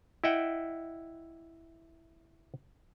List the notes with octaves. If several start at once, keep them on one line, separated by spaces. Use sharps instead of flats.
E4 D#5 E5 F#5 G5